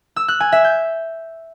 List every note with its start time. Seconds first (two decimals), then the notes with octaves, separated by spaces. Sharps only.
0.16 E6
0.28 F#6
0.40 G#5
0.52 E5
0.64 G6